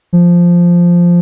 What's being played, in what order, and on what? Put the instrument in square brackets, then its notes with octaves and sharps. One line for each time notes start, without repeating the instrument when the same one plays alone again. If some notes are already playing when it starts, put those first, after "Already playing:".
[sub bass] F3